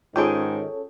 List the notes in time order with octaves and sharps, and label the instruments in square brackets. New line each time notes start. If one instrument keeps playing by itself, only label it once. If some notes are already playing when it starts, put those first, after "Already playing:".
[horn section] G#2 D#3 [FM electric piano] C#4 A4 C#5 [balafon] F4 [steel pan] G#4 G5